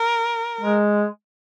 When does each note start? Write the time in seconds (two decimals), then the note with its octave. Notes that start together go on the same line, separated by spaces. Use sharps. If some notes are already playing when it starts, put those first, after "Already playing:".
Already playing: A#4
0.61 G#3